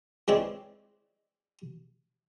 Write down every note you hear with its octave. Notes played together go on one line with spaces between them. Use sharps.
G#3 C4 E4 B4 C#5 D5